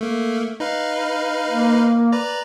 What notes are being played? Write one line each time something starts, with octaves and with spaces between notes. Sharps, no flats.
A3 A#3
D#4 B4 F5
A#3
B4 D5 A#5